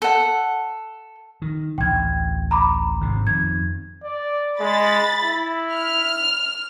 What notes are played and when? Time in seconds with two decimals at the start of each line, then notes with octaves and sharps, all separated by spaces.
0.02 A4 F#5
1.42 D#3
1.78 A1 D2 G5 G#6
2.51 A#5 B5 D6
3.01 G#1 G#2 C3
3.27 F2 D#3 G#6
4.04 D5
4.60 G#3 B5 A6
5.23 E4
5.73 F6